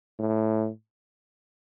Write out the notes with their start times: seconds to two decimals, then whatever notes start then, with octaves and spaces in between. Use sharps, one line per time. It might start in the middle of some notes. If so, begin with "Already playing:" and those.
0.19 A2